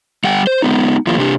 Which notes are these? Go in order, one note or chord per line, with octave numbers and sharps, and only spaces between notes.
G3 F#5 G5
C5
G#3 B3 D#4
D#3 F3 A#3 E4 F4
C3 D4 G4